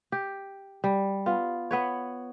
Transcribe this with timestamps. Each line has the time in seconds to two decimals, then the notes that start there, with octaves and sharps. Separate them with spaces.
0.12 G4
0.84 G3
1.26 B3 F4
1.71 B3 B4 C#5